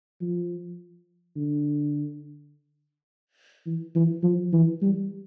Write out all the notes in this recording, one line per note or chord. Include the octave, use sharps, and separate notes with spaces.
F3
D3
E3
E3
F3
E3
G3